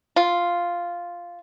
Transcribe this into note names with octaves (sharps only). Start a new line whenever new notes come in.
F4